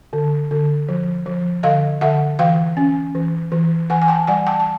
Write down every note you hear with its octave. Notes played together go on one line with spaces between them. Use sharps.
D3
D3
F3
F3
D3 D#5 F5
D3 E5 F#5
E3 F5 G5
C#4
E3
E3
E3 F#5 G#5
G#5
G5 A5
G3 F#5 G#5
G5 A5
A5